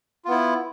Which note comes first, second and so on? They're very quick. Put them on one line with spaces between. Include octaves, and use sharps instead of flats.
F4 B3 E4